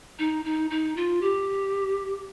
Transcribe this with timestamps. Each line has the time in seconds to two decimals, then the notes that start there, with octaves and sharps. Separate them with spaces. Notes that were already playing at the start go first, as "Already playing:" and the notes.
0.19 D#4
0.45 D#4
0.70 D#4
0.96 F4
1.22 G4